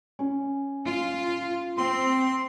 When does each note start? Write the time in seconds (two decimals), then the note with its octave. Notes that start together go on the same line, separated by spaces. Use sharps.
0.19 C#4
0.87 F4
1.78 C4 C6